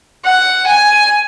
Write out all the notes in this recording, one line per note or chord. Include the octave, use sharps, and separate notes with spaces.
F#5
G#5